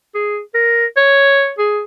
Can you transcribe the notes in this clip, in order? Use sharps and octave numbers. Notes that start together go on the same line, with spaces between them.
G#4
A#4
C#5
G#4